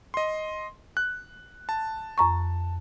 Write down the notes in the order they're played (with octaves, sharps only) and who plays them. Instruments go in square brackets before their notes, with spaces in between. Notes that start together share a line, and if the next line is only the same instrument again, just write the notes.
[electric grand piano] D#5 C6
F#6
A5
[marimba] F2 A#5 C#6